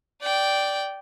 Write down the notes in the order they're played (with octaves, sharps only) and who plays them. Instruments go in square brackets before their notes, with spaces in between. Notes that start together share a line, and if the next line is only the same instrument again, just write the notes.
[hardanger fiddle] D5 G5